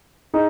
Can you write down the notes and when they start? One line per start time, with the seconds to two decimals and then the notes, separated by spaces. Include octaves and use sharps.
0.33 D#4 G#4